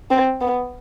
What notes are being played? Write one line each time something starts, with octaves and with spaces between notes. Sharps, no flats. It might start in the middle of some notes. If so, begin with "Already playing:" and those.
C4
B3